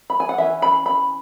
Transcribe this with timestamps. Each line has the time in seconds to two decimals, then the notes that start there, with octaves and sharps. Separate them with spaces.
0.10 B5
0.20 G#5
0.29 F#5
0.38 E3 C#4 E5
0.62 B5
0.86 B5